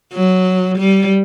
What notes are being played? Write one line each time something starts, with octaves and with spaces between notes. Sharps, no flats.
F#3
G3